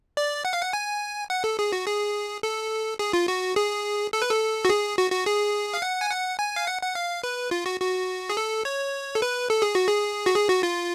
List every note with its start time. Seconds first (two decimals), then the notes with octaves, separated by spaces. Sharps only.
0.17 D5
0.45 F#5
0.53 F5
0.62 F#5
0.73 G#5
1.30 F#5
1.44 A4
1.59 G#4
1.72 F#4
1.87 G#4
2.43 A4
2.99 G#4
3.13 F4
3.28 F#4
3.56 G#4
4.13 A4
4.22 B4
4.31 A4
4.65 F#4
4.69 G#4
4.98 F#4
5.12 F#4
5.26 G#4
5.74 F5
5.82 F#5
6.01 G#5
6.10 F#5
6.39 G#5
6.56 F5
6.67 F#5
6.82 F#5
6.95 F5
7.24 B4
7.51 F4
7.66 F#4
7.80 F#4
8.30 G#4
8.37 A4
8.65 C#5
9.15 A4
9.22 B4
9.50 A4
9.62 G#4
9.75 F#4
9.88 G#4
10.26 F#4
10.35 G#4
10.49 F#4
10.63 F4